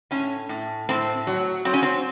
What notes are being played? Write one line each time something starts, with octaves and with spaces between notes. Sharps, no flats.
A2 C#4
A2
A2 C4
F#3
F#3 C4
C#4
C4